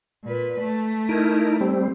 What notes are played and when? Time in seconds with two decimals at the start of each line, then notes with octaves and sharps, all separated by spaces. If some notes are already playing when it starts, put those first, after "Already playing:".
0.25 A#2 B4
0.61 A3
1.09 D#4 E4 A#4
1.61 G3 C4